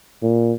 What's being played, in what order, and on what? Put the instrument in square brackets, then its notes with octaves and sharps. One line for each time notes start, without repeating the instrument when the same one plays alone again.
[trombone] A#2